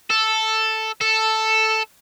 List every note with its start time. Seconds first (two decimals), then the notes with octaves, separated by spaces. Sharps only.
0.10 A4
1.01 A4